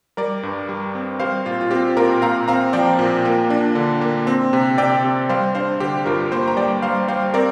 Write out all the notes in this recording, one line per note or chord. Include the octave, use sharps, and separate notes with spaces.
G3 A#4 D5
G2
G3
C4
G3 C5 F5
A#2 F4
F4
C4 G4
A#2 F4 A#4
A#2 F5 A#5
C4 F5 A#5
F3 D5 G5
A#2
A#3
D4
D3
A#3
C4
C3
C3 D5 G5
C3
G3 C5 F5
D4 C5 F5
D3 G4 C5
G2 F4 A#4
A#3 G4 C5
A#5
G3 D5 G5
G3 C5 F5
G3 C5 F5
C4 A#4 D5